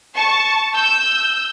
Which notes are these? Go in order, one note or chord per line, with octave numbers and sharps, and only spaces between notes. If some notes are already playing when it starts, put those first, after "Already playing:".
A5 C#6
E6 G6